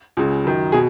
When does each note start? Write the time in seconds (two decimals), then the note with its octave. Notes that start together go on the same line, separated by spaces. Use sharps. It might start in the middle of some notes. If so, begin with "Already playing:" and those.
0.17 C#2 C#3
0.45 F#2 D#3
0.72 B2 G#4